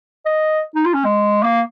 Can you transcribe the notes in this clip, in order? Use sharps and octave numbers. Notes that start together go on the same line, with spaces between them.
D#5
D#4
F4
C#4
G#3
A#3